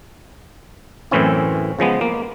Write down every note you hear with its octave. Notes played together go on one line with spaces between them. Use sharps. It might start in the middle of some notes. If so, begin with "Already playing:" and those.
F#2 A2 E3 C4 C#4 E4
C#3 F3 G#3 B3
A#3